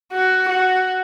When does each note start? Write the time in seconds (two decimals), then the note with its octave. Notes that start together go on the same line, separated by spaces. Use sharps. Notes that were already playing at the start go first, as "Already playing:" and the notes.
0.12 F#4
0.49 F#4